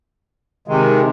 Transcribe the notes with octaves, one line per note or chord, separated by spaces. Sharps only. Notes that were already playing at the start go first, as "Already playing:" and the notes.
C3 D#3 G#3